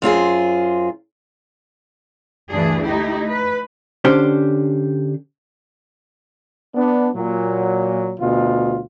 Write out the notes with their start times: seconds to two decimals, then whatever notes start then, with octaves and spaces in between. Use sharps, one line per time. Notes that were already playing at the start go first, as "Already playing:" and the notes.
0.02 F#2 C4 F4 G#4
2.49 D2 G2 E3 D4 G#4
2.84 A3 D#4 E4 G4
3.26 B4
4.05 D3 C#4 D4 G4 C5
6.74 B3 D4
7.14 A#2 F#3
8.19 D2 B2 F4